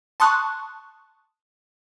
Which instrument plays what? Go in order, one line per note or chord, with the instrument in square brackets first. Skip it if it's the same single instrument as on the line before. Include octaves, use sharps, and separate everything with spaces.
[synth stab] A5 C6 C#6 D#6 F#6